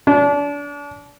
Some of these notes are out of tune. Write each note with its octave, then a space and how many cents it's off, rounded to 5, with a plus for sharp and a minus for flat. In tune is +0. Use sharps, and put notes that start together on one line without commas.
D4 -30